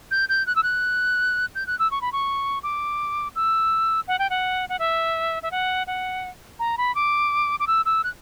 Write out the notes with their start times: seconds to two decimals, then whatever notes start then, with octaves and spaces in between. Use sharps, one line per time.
0.11 G6
0.29 G6
0.47 F#6
0.56 E6
0.63 F#6
1.55 G6
1.67 F#6
1.79 E6
1.91 C#6
2.01 B5
2.13 C#6
2.63 D6
3.35 E6
4.08 F#5
4.19 G5
4.30 F#5
4.69 F#5
4.79 E5
5.43 E5
5.51 F#5
5.87 F#5
6.59 A#5
6.78 B5
6.95 D6
7.60 D6
7.67 E6
7.86 E6
8.04 F#6